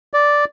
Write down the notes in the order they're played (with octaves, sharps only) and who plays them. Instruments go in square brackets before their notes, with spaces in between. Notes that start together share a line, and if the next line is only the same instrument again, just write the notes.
[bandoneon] D5